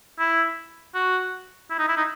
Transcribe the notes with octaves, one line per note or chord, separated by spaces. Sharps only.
E4
F#4
E4
D#4
E4
D#4